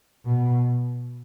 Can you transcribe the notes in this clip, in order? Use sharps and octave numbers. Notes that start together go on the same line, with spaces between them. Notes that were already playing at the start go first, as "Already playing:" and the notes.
B2